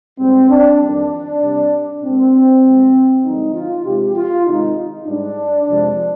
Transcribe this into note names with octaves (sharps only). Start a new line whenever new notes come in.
G#2 G3 C4
D4
F2 D#3 G3 D4
C3 G3
A#2 G#3 C4
G2 F3 G#3
G2 D3 F3 G#3 D#4
F4
C3 F3 G#3 G4
F4
C3 D#3 G#3 D#4
G#2 G3 D4
F2 C3 F3 G#3